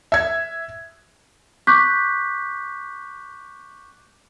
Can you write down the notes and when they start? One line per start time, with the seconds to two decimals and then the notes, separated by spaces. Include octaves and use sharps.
0.12 E5 G#6
1.67 C#6 D6 F#6 G6 B6